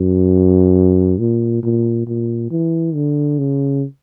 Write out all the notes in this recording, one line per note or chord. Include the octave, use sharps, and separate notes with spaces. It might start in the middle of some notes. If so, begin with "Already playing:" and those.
Already playing: F#2
A#2
A#2
A#2
E3
D3
C#3